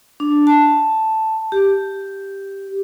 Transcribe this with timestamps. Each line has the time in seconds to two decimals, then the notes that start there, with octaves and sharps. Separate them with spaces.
0.20 D4
0.47 A5
1.52 G4